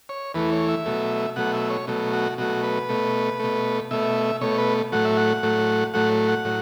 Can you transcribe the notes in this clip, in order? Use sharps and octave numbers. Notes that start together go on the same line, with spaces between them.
C#5
E2 E3 A3 B4
C#5
E5
B2 F#3 A3
B2 F#3 A3 F#5
E5
C#5
B2 F#3 A3
F#4
B2 F#3 A3 F#4
B4
B2 A3
B2 A3
B2 A3 E5
B2 A3 C#5
B4
A2 F#3 A3 F#5
E5
F#5
A2 F#3 A3
A2 F#3 A3 F#5
F#5
A2 F#3